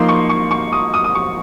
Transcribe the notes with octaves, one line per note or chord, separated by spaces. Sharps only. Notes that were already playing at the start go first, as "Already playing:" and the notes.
Already playing: F3 A#3 D#4 C6
C#6
C#6
C#6
D#6
D#6
D#6
C#6